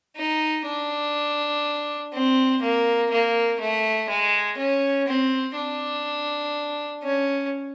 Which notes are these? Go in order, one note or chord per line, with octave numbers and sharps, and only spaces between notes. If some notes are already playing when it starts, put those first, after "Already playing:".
D#4
D4
C4
A#3
A#3
A3
G#3
C#4
C4
D4
C#4